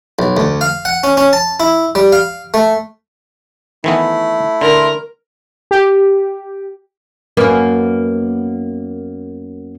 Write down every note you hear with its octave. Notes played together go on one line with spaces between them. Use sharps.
B1
D2
F5
F#5
C#4
C#4
A5
E4
G3
F5
A3
D#3 E3 A3 B3 E4
D3 A#4 C6
G4
F#2 A#3 B3